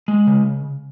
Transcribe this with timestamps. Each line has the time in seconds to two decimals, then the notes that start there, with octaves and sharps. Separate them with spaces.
0.08 G#3
0.27 C#3